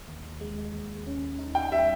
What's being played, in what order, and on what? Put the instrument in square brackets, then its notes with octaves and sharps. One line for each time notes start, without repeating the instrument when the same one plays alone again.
[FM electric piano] D#2
G#3
D#2
C#4
D#4
[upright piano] G5
[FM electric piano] G3 [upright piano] E5